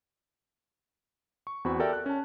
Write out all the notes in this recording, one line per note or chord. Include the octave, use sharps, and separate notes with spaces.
C#6
E2 C4 F#4 B5 C#6
G4 A4 A#4 D5 E5 G5
F#6
C#4 A5